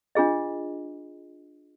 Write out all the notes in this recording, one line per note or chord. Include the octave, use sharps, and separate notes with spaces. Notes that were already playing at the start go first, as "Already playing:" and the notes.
D4 F4 G#4 D#5